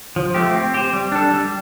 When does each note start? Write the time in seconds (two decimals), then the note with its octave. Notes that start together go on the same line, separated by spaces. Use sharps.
0.16 F3
0.34 A3 C4 G4
0.54 C4
0.74 G4 C5
0.93 G3
1.12 D4 A4
1.31 G3